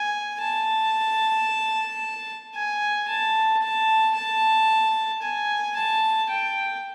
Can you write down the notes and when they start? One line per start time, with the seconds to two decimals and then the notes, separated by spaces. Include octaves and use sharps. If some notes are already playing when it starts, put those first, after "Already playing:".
Already playing: G#5
0.41 A5
2.55 G#5
3.08 A5
3.62 A5
4.15 A5
5.22 G#5
5.76 A5
6.30 G5